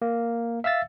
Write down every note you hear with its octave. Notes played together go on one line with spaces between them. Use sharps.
A#3
E5 F5 E6 A6